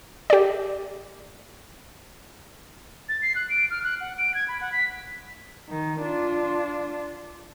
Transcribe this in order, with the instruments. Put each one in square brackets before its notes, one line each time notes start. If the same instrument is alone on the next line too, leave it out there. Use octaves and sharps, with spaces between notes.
[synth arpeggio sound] G4 D5
[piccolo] A6
C7
F#6
D7
F6
F#6
F#5
D7
G#6
B5
F#5
B6
[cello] D#3
D4 F4